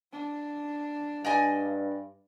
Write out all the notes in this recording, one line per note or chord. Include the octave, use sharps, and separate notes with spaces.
D4
G2 D5 D#5 G#5